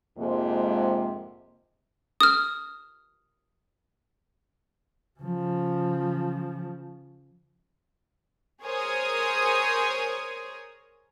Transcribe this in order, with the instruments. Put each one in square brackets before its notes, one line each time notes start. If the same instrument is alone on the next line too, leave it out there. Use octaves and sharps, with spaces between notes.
[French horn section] F2 G#2 C3 G#3 A#3
[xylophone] D#6 F6
[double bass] C#3 F3
[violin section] G#4 A#4 C5 C#5 G#5 D#6